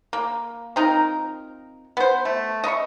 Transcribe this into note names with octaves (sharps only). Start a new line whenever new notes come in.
A#3
C4 D#4 F4 A#4
B3 C5
A3
D#5 E5 B5 C#6